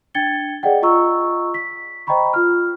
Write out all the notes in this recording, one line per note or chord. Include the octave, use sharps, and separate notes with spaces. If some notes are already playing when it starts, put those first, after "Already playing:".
D4 G5 G#6 A6 C#7 G7
G#4 D5 D#5 F#5 G5
F4 D#5 A#5 C#6 E6
B6
C5 D#5 G5 A#5 B5 C#6
F4 F6